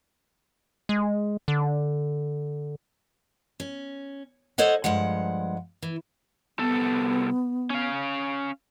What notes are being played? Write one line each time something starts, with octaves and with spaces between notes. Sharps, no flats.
G#3
D3
C#4
A4 C5 C#5 D#5 F#5
G2 F3 G#3 F#5
E3
C2 B3 A4
C#4 F5